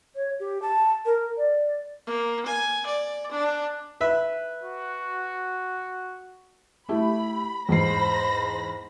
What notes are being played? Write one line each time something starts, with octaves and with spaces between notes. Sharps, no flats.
C#5
G4
A5
A#4
D5
A#3
G#5
D5
D4
B4 E5
F#4
A3 E4 G4 B5
E2 G#2 C5 B5 A#6 C7